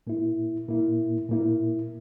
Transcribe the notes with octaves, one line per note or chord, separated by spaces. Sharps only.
A#2 A#3 E4
A#2 A#3 E4
A#2 A#3 E4